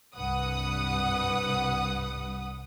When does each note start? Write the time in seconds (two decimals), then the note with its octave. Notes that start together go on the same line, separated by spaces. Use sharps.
0.16 C2 G2 B4 F#5 D#6